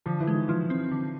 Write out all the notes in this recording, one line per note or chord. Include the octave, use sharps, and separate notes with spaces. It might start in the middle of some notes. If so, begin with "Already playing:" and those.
D3 F3
E3
G#3
D#3
E3 F3
C4
D3